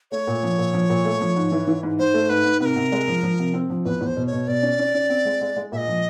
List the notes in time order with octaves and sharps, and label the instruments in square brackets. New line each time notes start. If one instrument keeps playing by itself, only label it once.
[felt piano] A3 [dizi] C#5
[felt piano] A#2
F3
A#2
F3
A#2
A3
F3
G#2
E3
E3
G#2
[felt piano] G#2 [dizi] C5
[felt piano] A3
[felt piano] G#2 [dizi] B4
[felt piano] G#2
[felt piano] C3 [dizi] B4
[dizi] A#4
[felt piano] C3
G#3
F3
F3
C3
C4
F3
[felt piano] E2 [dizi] B4
[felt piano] E2
[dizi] C5
[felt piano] B2
[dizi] C#5
[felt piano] B2
[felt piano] B2 [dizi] D5
[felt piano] C#4
C#4
C#4
C4
G#3
G#3
G#3
[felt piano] A#2 [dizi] E5
[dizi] D#5
[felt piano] F3